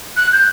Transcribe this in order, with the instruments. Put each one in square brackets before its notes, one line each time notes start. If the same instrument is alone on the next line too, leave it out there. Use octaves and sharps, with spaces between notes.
[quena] F#6
G6